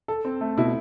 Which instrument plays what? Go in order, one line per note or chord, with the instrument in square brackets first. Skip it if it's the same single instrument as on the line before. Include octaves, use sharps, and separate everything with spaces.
[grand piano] A4
C4
A3
[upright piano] B2 [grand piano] E4